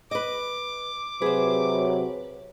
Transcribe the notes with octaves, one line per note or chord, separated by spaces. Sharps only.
B4 D#5 D6
C3 F#3 G#4 B4 C5